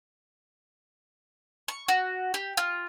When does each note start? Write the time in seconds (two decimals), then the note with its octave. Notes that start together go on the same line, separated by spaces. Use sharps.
1.68 C#6
1.88 F#4
2.34 G4
2.57 F4